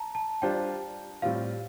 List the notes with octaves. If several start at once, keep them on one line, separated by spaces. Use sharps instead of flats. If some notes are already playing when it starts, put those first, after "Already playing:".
Already playing: A5 A#5
A5
G3 D4 F4 C5 G5
A2 G3 C4 F4 F5